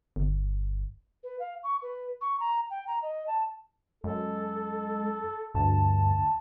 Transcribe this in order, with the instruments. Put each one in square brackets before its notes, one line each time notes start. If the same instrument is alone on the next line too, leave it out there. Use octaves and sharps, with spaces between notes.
[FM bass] G1
[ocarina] B4
F5
C#6
B4
C#6
A#5
G5
A#5
D#5
A5
[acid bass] F#2 [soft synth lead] G#3 [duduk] A4
[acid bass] D2 [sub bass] G2 [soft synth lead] A5